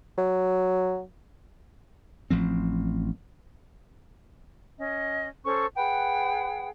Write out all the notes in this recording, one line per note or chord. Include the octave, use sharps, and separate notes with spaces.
F#3
A1 F3 C4
C#4 D#5
C#4 A4 C5 C#6
G#4 B4 F#5 G5